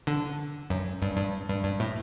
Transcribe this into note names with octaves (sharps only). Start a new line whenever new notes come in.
D3
F#2
G2
G2
G2
G2
A2